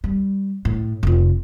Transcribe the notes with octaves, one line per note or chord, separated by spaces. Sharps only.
G3
A2
F1 F4